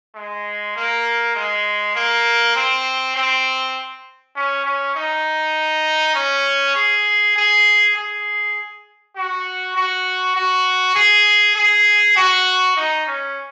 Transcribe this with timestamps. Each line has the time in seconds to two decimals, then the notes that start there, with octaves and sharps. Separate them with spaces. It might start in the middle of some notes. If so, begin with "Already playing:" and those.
0.15 G#3
0.76 A#3
1.35 G#3
1.95 A#3
2.56 C4
3.16 C4
4.35 C#4
4.65 C#4
4.95 D#4
6.15 C#4
6.75 G#4
7.36 G#4
7.96 G#4
9.16 F#4
9.76 F#4
10.36 F#4
10.96 G#4
11.56 G#4
12.16 F#4
12.77 D#4
13.07 C#4